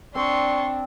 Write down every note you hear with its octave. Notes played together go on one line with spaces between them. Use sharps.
C4 D4 C6 C#6